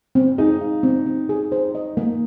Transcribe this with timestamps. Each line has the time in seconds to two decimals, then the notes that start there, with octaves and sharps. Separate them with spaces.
0.15 C4
0.38 D#4 G#4
0.61 F5
0.83 C4
1.06 C4
1.29 G#4
1.52 C5
1.75 D#5
1.97 A#3